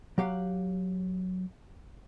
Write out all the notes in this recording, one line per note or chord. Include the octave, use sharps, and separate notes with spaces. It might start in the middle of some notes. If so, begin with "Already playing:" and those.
F#3 G4 F5 F#5